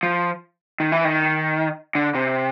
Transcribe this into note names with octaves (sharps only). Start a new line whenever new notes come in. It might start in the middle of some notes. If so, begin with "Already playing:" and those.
F3
D#3
E3
D#3
D3
C3